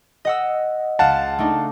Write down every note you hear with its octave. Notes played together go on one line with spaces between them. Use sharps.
D#5 F#5 E6
C#2 F5 F#5 A5 E7
A3 D4 D#4